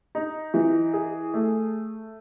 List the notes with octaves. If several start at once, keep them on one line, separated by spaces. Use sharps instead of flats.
D#4
E3
G#4
A3